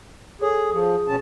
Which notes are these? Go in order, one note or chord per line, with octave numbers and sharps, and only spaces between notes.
G#4 A4 C#5
F3 G#4 D#6
B2 C#4 A5